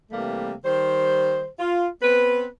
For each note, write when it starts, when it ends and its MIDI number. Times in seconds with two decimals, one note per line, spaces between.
0.11 0.52 48
0.11 0.52 52
0.11 0.52 55
0.11 0.52 57
0.11 0.52 58
0.64 1.46 51
0.64 1.46 55
0.64 1.46 72
1.59 1.87 65
2.01 2.46 59
2.01 2.46 60
2.01 2.46 71